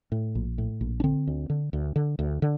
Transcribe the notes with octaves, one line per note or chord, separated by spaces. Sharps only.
A2
A#1
A2
A#1
D4
D3 C4
D2
D3
D2
D3
D2
D3